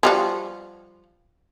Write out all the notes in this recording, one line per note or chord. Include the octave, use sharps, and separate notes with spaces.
F3 G3 F#4